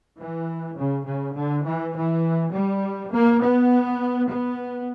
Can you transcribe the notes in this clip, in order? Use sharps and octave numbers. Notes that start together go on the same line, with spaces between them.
E3
C#3
C#3
D3
E3
E3
G3
A#3
B3
B3